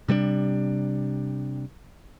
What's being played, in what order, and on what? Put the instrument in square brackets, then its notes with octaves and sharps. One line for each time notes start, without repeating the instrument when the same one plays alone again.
[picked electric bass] C3 G3 G#3 D4